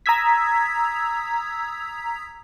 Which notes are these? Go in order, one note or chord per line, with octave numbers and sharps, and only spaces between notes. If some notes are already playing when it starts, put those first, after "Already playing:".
A#5 D#6 E6 G#6 B6